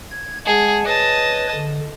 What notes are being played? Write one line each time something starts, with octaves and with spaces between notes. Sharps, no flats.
G#6
G#3 G#4 F#5 A5
B4 C#5 D#5 A5
D3